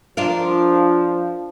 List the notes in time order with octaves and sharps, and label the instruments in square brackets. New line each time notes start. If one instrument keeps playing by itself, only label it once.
[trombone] F3 [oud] D4 F4 A#4